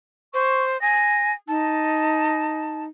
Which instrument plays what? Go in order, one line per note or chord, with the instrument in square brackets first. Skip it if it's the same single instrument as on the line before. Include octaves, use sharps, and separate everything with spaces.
[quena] C5 [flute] C#6
[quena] G#5 [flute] A#6
[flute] D#4 [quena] A5